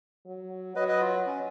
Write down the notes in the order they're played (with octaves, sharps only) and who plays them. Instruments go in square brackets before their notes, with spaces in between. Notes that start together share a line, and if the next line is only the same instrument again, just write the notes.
[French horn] F#3
[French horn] F#3 [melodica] B4 D#5
[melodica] B4 D#5
F4
C#4